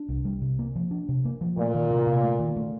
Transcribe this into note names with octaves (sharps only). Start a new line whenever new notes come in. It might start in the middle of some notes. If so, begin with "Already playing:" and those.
Already playing: D4
C2
G3
C3
A#3
F3
D4
C3
A#3
F3
A#2 A3
D#3
C3
C3
A3
D#3
A3